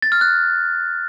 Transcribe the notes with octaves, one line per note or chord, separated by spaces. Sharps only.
A6
F6
F#6